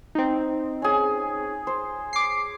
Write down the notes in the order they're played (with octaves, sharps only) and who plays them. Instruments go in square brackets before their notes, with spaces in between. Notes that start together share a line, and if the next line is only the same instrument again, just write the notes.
[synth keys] C4 D#4
[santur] C#4 G#4
C5
[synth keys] D6 C7